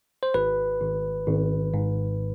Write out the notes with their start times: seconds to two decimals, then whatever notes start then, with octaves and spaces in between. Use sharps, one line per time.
0.23 C5
0.34 G#1 B4
0.81 G#1
1.28 G#1
1.74 G#2